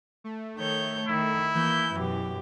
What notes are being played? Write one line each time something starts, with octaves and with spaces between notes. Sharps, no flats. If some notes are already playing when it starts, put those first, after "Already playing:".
A3
D#3 C#5 G6
D#3 E4
E3 A#3 G6
F#2 B2 G4